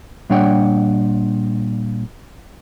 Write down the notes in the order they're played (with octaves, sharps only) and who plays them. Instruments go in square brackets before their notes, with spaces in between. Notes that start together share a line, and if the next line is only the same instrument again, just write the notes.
[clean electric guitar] A#2 G3 D4 C#5 F#5 G5